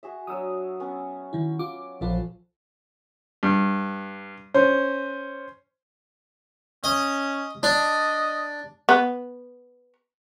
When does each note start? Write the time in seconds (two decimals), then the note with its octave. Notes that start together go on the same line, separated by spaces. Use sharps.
0.03 F#4 G#4 E5
0.27 F#3 D4 C#5 D#6 E6
0.80 B3 C#4
1.33 D#3 E4
1.59 F4 D6
2.01 A#1 F3 F4 A4 B4 F5
3.43 G2
4.54 C#4 C5
6.84 C#4 D#5
7.63 D4 D#5
8.89 B3